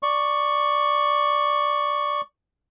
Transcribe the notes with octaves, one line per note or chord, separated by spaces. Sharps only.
D5 C#6